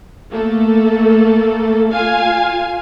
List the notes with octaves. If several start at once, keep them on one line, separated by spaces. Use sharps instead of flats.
A3 A#3 A4
F4 F5 G#5